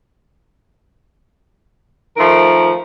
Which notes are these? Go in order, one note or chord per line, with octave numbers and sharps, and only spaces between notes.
D#3 F3 A3 A#4